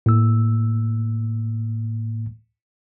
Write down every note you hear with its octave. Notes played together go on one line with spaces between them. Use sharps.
A2 A#3 E6